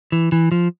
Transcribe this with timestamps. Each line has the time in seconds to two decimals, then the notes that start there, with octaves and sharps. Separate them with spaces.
0.12 E3
0.32 E3
0.52 F3